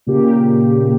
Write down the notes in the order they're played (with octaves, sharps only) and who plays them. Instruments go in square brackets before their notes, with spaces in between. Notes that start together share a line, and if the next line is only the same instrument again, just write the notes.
[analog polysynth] A#2 C#3 A#3 G4